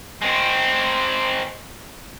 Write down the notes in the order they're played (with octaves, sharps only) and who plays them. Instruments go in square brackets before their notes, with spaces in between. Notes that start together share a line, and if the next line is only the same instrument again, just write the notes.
[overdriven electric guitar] G#3 C4